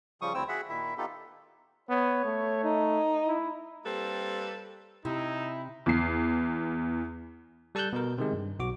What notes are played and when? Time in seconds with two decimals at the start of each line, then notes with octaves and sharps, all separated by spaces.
0.22 C#3 F3 G3 C#6 D#6
0.34 D2 C4 E4 G5 E6
0.48 F#4 G#4 E5 F#5
0.69 A#2 D#3 E4 E5
0.98 B3 D#4 F4 G4 A4
1.89 B3 C#5
2.25 A3
2.64 D#4
3.27 E4
3.84 G3 A#3 C4 A4 B4
5.05 C3 D#4 E4
5.86 E2 C7
7.75 G3 A4 A5 E6 F#6 G6
7.93 B2 A#4
8.18 C3 D#3 G#3
8.33 G2
8.59 B1 F#4 D6